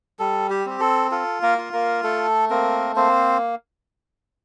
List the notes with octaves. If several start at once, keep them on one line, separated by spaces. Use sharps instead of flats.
G3 A4
G4
C4 G4
A4
F4 A4
A#3 A#4
F4
A#3 A#4
A3 A4
A#3 C4 A#4
A#3 C4 C5